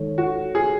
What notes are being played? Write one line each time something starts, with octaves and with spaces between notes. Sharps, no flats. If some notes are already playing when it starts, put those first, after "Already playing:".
Already playing: D#3 G#3 D#4 A4 C#5
F#4
G#4